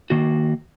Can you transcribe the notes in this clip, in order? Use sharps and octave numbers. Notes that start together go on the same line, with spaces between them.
D#3 A#3 F#4